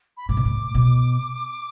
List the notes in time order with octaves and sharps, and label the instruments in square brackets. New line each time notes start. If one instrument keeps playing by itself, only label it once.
[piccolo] B5
[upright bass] A2 [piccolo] D6
[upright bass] B2
A2
B2